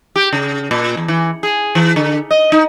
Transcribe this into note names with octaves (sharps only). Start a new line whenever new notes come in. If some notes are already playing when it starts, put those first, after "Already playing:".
G4
C#3
A#2
E2
E3
G#4
E3
D3
D#5
D#4